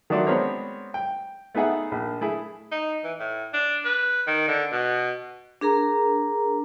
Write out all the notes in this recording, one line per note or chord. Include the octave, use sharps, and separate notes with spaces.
D#3 F#3 A3 D4 F#4 C6
G#3 B3 C4 D4 A#4 C#5
G5
A3 B3 D#4 G#4 E5 F#5
A#1
A3 E4 G#4
D#4
E3
A2
D4
B4
D#3
D3
B2
D4 G#4 A#4 A#5